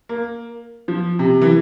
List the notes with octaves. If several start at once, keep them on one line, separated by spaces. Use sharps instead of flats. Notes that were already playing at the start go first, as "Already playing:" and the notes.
A#3
F3
C3
E3